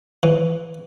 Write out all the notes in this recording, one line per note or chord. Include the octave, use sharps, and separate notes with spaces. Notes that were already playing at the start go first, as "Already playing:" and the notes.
E3